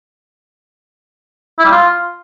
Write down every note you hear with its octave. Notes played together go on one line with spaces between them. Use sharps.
E4
G3
F4